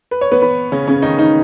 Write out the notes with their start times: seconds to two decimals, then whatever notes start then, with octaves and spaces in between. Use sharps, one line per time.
0.11 B4
0.21 C#5
0.32 B3 B4
0.42 B3 B4
0.72 C#3 C#4
0.87 C#3 C#4
1.02 D#3 D#4
1.18 D#3 D#4